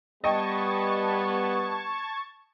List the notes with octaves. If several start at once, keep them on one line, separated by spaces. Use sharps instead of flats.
G3 B3 D#5 G5 A5 C#6 G#6